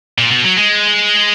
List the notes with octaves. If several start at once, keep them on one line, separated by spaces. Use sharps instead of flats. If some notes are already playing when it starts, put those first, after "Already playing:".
A#2
B2
F#3
G#3